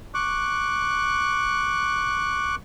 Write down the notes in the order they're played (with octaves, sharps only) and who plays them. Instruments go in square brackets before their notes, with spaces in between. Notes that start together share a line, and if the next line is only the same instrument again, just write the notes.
[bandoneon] C#6 D6 F#6